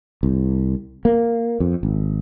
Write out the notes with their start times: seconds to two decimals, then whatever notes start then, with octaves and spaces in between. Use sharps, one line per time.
0.23 C2
1.05 A#3
1.60 F2
1.83 G#1